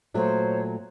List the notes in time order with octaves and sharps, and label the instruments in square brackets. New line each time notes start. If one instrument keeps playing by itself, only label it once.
[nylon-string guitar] A#2 F#3 A3 [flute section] C5 C#5